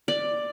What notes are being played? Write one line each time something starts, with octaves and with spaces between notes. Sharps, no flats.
D5